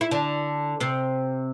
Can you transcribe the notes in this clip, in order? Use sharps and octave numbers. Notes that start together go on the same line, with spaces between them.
E4
D3 D4
C3 C4